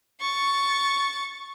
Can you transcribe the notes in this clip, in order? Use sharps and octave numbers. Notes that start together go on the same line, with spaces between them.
C#6 A6